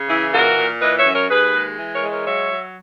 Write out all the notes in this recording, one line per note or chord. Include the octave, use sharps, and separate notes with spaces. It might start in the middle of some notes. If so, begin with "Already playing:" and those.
Already playing: C#3
E3 E4 G#4
A#2 F#4 A#4
A#2
E3 B4 D#5
C#5 E5
F#2
A#4 C#5
D#2 G#4 B4
G#3
E3
A#4 C#5
G#3
A#4 C#5
F#3 C#5 E5
F#3